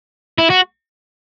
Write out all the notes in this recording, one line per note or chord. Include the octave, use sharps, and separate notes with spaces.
E4
F#4